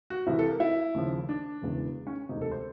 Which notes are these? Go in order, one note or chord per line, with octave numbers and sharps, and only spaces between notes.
F#4
C2 C3 E3 E4
A4
A#4
E4
D#2 C#3 F3
D4
E1 E2 C#3 E3
C#4
E1 D2 C3 D#4
A4
C5